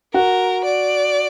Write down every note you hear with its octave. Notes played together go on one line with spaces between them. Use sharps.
F#4 A#4
D5